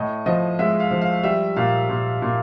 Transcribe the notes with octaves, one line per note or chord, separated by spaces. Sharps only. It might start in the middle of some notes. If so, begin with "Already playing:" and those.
Already playing: A2 D#5
F3 D#5
G#3 E5
F5
F3
F5
G3 E5
A#2 F5
A#2
A#2